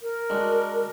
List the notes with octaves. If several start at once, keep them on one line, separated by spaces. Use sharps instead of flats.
A#4
G#3 D4 F#4